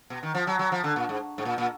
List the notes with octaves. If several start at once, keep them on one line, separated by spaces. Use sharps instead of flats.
B2
D#3
F3
F#3
F#3
F3
D3
A#2
G#2
G#2
A#2
A#2